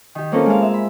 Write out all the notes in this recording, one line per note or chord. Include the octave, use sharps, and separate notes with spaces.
D#3 G4
A#3 C4 C#4 F4 A4 A#4
G#3 C4 F5
E5
B5